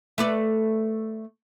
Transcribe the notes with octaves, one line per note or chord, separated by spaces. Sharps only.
A3 B4 D5